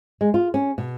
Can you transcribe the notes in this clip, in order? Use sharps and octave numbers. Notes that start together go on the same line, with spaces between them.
G#3
F4
C#4
B2